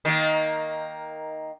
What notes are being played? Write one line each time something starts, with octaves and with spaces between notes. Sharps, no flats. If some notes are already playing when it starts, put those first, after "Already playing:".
D#3 A#3